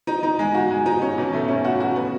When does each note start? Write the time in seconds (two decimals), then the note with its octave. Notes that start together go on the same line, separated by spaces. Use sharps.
0.07 D#4
0.23 D#4
0.39 G#3
0.54 F#4
0.70 G#3
0.86 D#4
1.02 C#4
1.18 B2
1.33 A3
1.48 C#4
1.64 F#4
1.80 F#4
1.96 B3